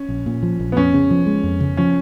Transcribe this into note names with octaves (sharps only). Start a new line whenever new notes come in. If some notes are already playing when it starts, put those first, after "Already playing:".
Already playing: C#4
A#1
A#2
F3
A#1
B3
F2 C#4
C#3
F3
G#3
F2
C#3
F3 C#4